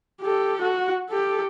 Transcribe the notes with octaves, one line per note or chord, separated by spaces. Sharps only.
G4 A4
F#4
G4 A4